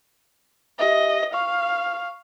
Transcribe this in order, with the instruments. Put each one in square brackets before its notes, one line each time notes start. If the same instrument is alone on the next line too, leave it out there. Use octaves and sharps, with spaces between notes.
[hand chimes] G4 E5 [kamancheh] D#5
[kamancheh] F5 [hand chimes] C#6